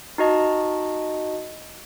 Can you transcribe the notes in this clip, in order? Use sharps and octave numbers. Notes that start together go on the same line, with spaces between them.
D#4 F#4 D#5 A5